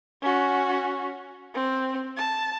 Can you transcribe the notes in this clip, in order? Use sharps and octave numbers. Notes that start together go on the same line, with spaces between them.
C#4 F#4
C4
A5